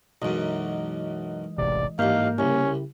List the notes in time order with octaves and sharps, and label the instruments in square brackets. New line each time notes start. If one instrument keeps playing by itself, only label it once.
[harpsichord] B1 F#2 [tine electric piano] E3 G#3 D#5
[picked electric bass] E1 A1 C3 [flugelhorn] D5
[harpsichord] A1 D#2 [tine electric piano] G#2 F6 G6 [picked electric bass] A#3 [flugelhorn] F5
[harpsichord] C2 [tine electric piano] C#3 E4 G4 [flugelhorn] C#4